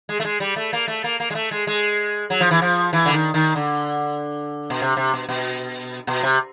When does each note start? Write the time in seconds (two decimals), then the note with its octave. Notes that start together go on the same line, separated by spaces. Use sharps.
0.09 G#3
0.20 A3
0.25 G#3
0.40 G3
0.56 A3
0.73 A#3
0.88 A3
1.04 A#3
1.20 A#3
1.30 G#3
1.35 A3
1.51 G#3
1.67 G#3
2.30 F#3
2.40 F3
2.51 E3
2.62 F3
2.93 E3
3.05 D3
3.13 D#3
3.34 D#3
3.56 D3
4.70 B2
4.82 C3
4.97 C3
5.14 B2
5.29 B2
6.07 B2
6.23 C3